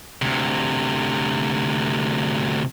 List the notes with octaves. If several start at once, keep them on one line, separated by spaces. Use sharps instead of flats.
D2 C3